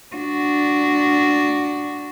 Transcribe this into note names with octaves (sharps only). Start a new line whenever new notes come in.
D4 F#4